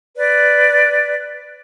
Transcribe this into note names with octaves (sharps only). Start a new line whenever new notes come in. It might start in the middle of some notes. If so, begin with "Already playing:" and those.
B4 D5